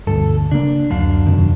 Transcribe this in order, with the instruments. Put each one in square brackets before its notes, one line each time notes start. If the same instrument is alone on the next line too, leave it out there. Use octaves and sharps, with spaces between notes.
[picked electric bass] D2 G2 G3 [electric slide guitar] A4
[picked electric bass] C#3 A#3 [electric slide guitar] D4
[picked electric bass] D1 [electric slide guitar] F#2 D4 F5
[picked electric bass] E2 C3 D#3